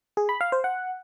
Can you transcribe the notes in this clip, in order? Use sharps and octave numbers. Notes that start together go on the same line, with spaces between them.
G#4
B5
F5
C5
F#5